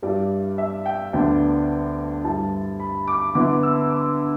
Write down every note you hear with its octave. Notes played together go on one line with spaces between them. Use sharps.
G2 G3 E4 D5
E5
G5
D2 D3 B3 D4 G5
G2 G3 E4 A5
B5
D6
D3 B3 E4 D6
E6
D6